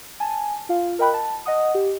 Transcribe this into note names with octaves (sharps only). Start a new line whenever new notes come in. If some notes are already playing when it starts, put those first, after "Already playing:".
G#5 A5
F4 F5
A#4 D#5 G5 B5 F#6
A5
D#5 F#5 D#6
G4